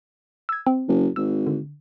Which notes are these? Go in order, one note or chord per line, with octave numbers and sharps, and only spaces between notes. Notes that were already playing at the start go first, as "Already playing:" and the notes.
E6 G#6
C4
F#1
G#1 E6
D3